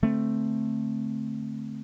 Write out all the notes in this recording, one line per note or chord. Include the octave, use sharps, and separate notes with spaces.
D3 A3 C4